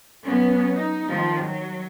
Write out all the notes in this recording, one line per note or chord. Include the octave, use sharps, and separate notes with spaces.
F#3 B3 C#4
D#4
D#3 F3
F#3